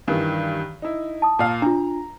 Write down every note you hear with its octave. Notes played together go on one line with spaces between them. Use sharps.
G2 D#3 E3
D#4 E4
A5 D#6
A#2 F5
D4 F4 A#5